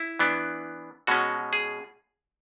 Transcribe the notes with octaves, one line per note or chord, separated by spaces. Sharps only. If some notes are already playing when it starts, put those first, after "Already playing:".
Already playing: E4
E3 B3 D4
B2 G#3 C#4 F#4
G#4